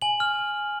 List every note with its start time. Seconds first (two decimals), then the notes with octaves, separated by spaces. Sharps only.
0.02 G#5 F#7
0.20 F6